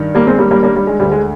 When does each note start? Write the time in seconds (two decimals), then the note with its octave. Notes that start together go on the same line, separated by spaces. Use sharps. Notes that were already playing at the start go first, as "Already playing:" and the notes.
Already playing: G2 D#3
0.15 G3 A#3
0.27 G#3 C4
0.39 G3 A#3
0.51 G3 A#3
0.63 G3 A#3
0.76 G3
0.87 G#3
1.00 D2 D3 G3
1.12 G#3